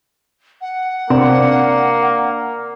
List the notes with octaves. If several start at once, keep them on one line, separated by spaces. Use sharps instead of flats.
F#5
C3 A#3 C4 D4